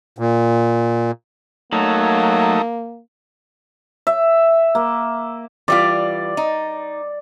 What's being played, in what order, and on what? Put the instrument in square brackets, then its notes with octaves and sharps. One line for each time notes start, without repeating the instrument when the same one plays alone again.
[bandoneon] A#2
[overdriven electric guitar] F#3 [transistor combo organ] A3 D#4 [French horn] A#3
[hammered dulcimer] E5
A#3
[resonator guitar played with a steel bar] E3 G3 F4 [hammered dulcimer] D5
[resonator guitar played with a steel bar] D#4